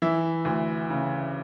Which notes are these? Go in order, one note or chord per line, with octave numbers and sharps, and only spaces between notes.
E3 E5
D2
C#3